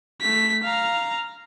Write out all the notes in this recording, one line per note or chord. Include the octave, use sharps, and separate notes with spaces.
A3 B6
F5 A#5